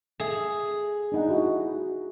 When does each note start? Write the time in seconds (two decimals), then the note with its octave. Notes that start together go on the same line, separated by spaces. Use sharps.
0.20 G#4 A4 E5
1.12 D4 D#4 F#5
1.29 E4 F#4